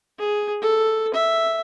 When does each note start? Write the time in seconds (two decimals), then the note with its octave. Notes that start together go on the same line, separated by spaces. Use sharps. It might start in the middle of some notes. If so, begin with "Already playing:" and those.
0.19 G#4
0.62 A4
1.14 E5